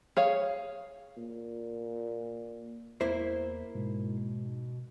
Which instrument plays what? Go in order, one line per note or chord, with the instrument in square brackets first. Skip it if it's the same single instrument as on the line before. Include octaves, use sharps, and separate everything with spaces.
[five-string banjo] G#4 C#5 F5
[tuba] A#2
[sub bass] E2 [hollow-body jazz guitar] A#3 E4 C5
[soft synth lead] G#2 [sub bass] B2